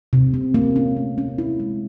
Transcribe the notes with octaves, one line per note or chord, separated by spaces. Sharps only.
C3
C4
A#3
C#4
A3
C#4
E4
G#3